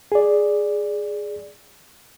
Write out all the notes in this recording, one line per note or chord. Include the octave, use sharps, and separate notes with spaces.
G#4 D5